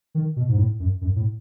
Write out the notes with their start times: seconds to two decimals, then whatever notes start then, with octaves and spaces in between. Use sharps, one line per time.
0.15 D#3
0.36 B2
0.48 G#2
0.57 A2
0.79 F#2
1.01 F#2
1.16 A2